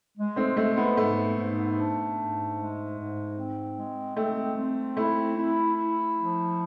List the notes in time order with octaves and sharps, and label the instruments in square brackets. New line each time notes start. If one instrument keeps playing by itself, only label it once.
[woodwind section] G#3
[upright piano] A3 C4
[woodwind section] G#3 [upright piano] A3 C4
[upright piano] B3
[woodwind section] G#2 [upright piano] A3
[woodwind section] G#2
D4
G#2
G#3
G#2
C4
G#3
[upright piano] A3 [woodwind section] C4
[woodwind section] C4
[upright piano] A3 [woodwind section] E4
[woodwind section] E4
E4
F3